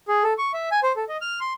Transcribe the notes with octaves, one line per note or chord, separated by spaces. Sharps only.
G#4
A4
C#6
E5
G#5
C5
A4
D#5
F6
C6